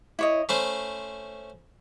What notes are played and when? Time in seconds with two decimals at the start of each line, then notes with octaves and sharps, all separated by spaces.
0.19 E4 C#5 D#5
0.49 A3 C#4 C5 B5